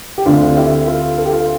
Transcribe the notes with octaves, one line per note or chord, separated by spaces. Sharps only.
G4
D2 D3 A3 C4 D4 F4
E4 G4
F4 A4
A4
G4
F4 A4